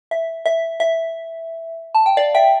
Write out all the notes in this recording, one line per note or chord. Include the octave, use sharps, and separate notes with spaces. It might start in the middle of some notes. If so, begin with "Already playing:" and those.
E5
E5
E5
A5
G5
D5 F5
E5 G5